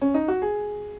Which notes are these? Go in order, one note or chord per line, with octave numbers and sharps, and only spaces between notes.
C#4
D#4
F#4
G#4